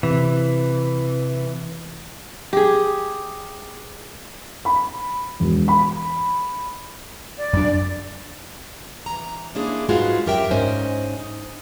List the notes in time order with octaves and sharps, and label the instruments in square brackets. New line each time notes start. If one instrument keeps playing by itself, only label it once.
[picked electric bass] C3 [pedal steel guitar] E3
[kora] G4 G#4
[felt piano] B5
E1
B5
[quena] D5
[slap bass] F#2 D4
[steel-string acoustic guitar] E3 A#5
G#3 A#3 C#4 D4 E4 G#4
G#2 G#3 F4 F#4 B4
F#2 G4 A#4 E5 G5
G#2 C#4 C5 D#5 G#5
D#4